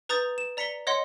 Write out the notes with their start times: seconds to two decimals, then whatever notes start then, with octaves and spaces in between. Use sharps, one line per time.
0.09 B4 A#5 D#6 G6 A6
0.38 E7
0.57 D5 A#5 B6 C#7 F7 G7
0.87 C#5 D#5 F#5 C6